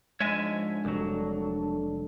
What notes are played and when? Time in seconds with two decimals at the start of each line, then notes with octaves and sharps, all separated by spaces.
0.20 G#2 F3 G#3 D4 C#5 E5 G#5
0.85 F1 C2 F#3 D4 A4